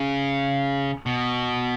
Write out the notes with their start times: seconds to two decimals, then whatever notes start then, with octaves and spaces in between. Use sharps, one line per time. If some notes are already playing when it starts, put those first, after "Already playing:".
Already playing: C#3
1.06 B2